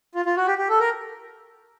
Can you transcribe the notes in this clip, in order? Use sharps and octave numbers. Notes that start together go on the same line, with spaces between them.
F4
F4
F#4
G4
G4
A4
A#4